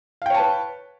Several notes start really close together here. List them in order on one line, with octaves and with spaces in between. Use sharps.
F5 G5 C#5 A5 B4